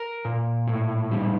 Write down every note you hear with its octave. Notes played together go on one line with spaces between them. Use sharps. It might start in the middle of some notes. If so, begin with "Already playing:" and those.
Already playing: A#4
A#2
A2
G3